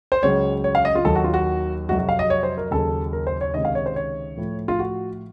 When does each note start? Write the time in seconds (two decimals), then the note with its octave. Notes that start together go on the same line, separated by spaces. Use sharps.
0.12 C5
0.23 C#2 C#3 F#3 C#5
0.64 C#5
0.75 F5
0.85 D#5
0.95 F4
1.05 D#2 D#3 F#3 A4
1.16 F#4
1.24 F4
1.34 F#4
1.89 F2 C3 F#3 F#4
1.99 F#4
2.09 F5
2.19 D#5
2.30 C#5
2.43 C5
2.57 A#4
2.71 D#2 C#3 F#3 A4
3.13 A#4
3.27 C5
3.41 C#5
3.54 C#2 C3 D#3 D#5
3.65 F5
3.75 C#5
3.86 C5
3.96 C#5
4.37 A2 F3
4.68 F4
4.79 F#4